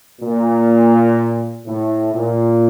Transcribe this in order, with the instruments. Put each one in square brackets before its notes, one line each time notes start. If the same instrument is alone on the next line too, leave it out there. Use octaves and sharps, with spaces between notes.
[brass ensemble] A#2
A2
A#2